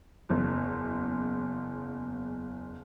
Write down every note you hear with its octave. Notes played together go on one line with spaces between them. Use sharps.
F#1 E2